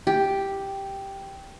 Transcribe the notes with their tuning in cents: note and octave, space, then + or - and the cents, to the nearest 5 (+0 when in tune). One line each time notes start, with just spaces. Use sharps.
G4 +0